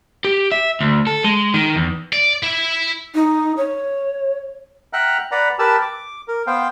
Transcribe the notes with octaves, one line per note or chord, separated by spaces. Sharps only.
G4
E5
D2
A4
G#3
D#3
E2
D5
E4 E5
D#4
C#5
E5 F#5 G5 A#5 F6 F#6
B4 D5 F#5 A#5 B5
G4 A#4 B4 A5 E6
D6
A#4
B3 C5 F5 G5